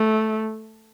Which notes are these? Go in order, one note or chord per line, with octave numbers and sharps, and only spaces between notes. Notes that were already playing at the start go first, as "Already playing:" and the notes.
Already playing: A3